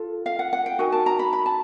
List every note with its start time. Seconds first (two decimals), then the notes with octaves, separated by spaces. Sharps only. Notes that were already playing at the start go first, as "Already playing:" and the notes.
Already playing: F4 A4
0.26 F5
0.39 F#5
0.53 F#5
0.66 G5
0.79 D#4 F#4 A#4 G#5
0.92 A5
1.06 A#5
1.19 B5
1.33 B5
1.46 A5